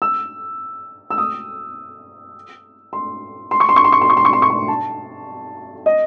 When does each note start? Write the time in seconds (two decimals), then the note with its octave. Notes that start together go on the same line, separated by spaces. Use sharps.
0.02 E6
1.10 E6
1.18 D#6
2.93 C6
3.51 C6
3.60 C#6
3.69 C6
3.76 C#6
3.84 C6
3.92 C#6
4.01 C6
4.10 C#6
4.17 C6
4.25 C#6
4.33 C6
4.42 C#6
4.50 C6
4.68 A5
5.86 D#5